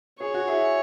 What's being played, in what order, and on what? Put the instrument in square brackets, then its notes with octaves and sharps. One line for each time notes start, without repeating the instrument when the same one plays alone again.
[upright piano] G#4 [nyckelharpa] C#5
[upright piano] F#4
E4 G#4